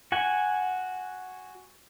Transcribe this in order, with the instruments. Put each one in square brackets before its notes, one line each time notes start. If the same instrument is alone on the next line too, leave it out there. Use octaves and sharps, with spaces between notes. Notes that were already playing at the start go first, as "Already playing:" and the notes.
[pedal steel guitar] F#4 F#5 G#5